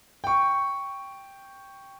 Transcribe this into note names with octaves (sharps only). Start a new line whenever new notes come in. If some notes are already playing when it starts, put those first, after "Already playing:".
G5 C#6